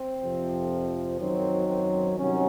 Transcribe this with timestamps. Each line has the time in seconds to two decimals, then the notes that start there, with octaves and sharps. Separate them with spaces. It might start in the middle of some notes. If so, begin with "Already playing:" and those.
Already playing: C4
0.22 F2 C3 F3
1.19 F#2 D#3 F#3 C4
1.67 C4
2.16 C2 C3 D#3 F#3 C#4